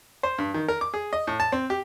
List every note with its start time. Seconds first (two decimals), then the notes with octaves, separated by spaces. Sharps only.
0.23 C5
0.38 G2
0.54 D#3
0.68 A#4
0.81 D6
0.94 G#4
1.13 D#5
1.27 A2
1.40 A5
1.52 C4
1.70 G4